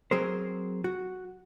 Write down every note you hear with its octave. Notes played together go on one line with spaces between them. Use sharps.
F#3 C4 G#4 A#4 C5
F#4